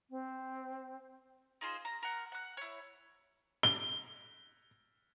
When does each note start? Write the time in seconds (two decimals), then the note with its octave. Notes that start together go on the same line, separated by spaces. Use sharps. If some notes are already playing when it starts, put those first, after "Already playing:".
0.10 C4
1.61 D#4 F4 G#4 C5
1.85 A#5
2.03 A#4 F#5
2.32 F#5 F#6
2.57 E4 C#5
3.63 G7